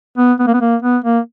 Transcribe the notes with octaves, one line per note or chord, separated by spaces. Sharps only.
B3
B3
A#3
B3
A#3
B3
A#3